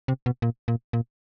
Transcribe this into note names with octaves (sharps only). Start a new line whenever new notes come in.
C3
B2
A#2
A#2
A#2